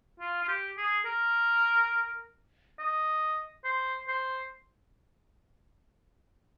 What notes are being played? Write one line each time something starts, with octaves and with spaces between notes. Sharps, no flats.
F4
F4
G4
G#4
A#4
D#5
C5
C5